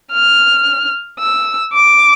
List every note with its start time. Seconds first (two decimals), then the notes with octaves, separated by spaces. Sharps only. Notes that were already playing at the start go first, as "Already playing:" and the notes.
0.12 F6
1.20 E6
1.73 D6